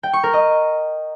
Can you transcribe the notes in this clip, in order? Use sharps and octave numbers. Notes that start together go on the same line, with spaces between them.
G5
C#6
A#4
D#5